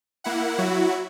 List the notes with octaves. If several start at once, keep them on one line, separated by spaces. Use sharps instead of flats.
A#3 E4 F#5
F#3 E4 F#4